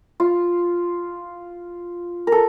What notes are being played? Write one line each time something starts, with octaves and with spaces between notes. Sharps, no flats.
F4
A4 A#4